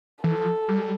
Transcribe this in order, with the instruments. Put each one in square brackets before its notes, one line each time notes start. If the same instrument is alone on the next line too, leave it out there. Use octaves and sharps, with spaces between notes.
[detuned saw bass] E3 [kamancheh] A4
[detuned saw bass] F3
G3